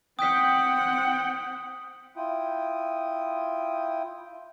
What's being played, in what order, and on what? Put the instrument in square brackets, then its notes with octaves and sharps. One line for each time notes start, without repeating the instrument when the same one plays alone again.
[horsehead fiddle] C4 F#5 [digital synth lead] G5 [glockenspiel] D#6 G6 B6
[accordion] E4 F4 G5 D#6